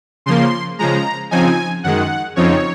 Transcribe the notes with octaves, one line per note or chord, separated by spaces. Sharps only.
C#3 F3 A#3 C6
C#3 F3 G#3 A#5
C#3 F3 C4 D#4 G#5
F#2 D#3 G#3 F#5
F2 C#3 F3 C4 D#4 C#5